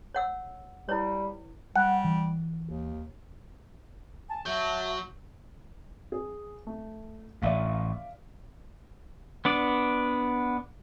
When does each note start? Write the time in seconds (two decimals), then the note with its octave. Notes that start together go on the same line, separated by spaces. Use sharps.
0.15 C#5 F#5 E6
0.89 G3 E4 B4 C#5
1.76 G3 F#5
2.04 E3
2.64 D#2
4.29 G#5 A5
4.46 F#3 E5 G6
6.12 G#4
6.67 A3
7.42 A1 A2 D5 E5 F5
9.45 B3 D4 D5